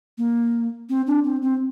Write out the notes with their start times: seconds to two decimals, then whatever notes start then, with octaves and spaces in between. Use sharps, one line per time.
0.18 A#3
0.89 C4
1.07 D4
1.24 C4
1.42 C4